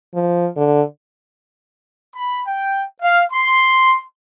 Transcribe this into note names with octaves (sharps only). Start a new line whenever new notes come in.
F3
D3
B5
G5
F5
C6